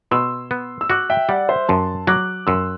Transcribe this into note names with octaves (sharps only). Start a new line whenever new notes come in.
B2 C6 E6
B3
E6
F#4 D6 F#6
E5 G5
G3 D5 F#5
C5 E5
F#2 A5 C6
F#3 D6 F#6
F#2 C6 E6